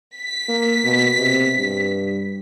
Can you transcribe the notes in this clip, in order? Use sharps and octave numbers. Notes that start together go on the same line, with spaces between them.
B6
A#3
B2
C3
G2